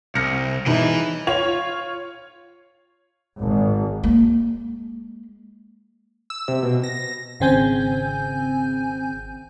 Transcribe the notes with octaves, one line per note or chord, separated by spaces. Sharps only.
C2 F6 A#6 C#7
E1 E3 D#4 B4 E5
F4 C#5 F7
G#1
G#3 A#3
E6
C3
B2
A#6
G#1 C#3 C4 G#5 G6